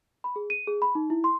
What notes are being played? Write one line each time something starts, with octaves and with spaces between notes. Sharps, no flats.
B5
G#4
D#7
G#4
B5
D#4
E4
C6